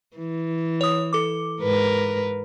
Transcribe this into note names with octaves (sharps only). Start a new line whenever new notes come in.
E3
C#5 D#6
A4 D6
G#2 A#4 B4